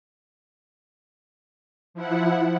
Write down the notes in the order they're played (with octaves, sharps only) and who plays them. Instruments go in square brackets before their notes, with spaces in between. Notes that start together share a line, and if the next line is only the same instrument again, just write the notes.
[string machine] F3 E4 F#5